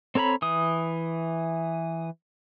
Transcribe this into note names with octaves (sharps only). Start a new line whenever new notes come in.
C4 A4 C#5 A#5 B5
E3 D#6